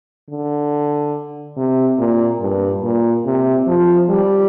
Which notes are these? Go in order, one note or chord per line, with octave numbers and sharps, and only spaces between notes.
D3
C3
A#2
G2
A#2
C3
F3
G3